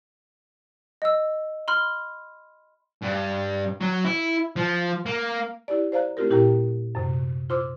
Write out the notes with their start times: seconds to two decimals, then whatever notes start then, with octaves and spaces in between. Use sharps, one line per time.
1.02 D#5 E6
1.68 B5 C6 F6
3.02 G2
3.81 F#3
4.05 E4
4.56 F3
5.06 A#3
5.68 E4 G4 D5
5.92 C5 D5 F5 A#5 F#6
6.17 A3 C4 E4 F4 G4 A#4
6.30 A#2 E4 G4 A#4 G5 A#5
6.95 F#2 C3
7.50 F4 C5 C6 D6 E6